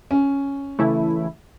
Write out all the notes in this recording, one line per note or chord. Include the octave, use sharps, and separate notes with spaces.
C#4
C#3 E3 A3 E4